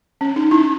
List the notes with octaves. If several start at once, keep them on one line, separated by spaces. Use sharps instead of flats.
C#4
D#4
E4